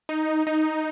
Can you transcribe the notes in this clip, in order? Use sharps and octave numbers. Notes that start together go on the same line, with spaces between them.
D#4
D#4